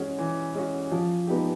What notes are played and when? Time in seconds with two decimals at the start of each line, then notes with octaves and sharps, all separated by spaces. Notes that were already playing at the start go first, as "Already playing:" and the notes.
Already playing: E3 G#3 C#4 F#4
0.19 E3
0.55 G#3 C#4 F#4
0.92 F3
1.27 G#3 B3 D#4 G4